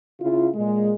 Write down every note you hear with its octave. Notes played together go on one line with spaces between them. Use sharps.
C#3 E4 F4
A#2 G#3